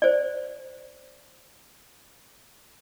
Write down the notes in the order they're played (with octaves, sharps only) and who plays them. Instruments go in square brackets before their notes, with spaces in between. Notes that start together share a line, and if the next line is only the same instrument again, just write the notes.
[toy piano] C5 D5